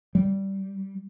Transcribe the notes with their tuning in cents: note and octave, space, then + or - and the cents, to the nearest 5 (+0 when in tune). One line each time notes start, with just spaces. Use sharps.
G3 -15